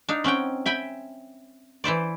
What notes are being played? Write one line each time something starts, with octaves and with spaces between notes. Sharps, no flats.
D4 D#4 F5
C4 C#4 F#5 G5
E5 G5 G#5 B5
E3 E4 C5 D5